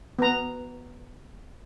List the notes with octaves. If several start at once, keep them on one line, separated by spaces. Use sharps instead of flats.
B3 A#5